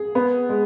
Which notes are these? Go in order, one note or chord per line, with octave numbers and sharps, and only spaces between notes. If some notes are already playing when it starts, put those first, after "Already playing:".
Already playing: G#4
B3
G#3